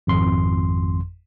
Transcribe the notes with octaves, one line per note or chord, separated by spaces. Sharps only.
G#1 F2 C6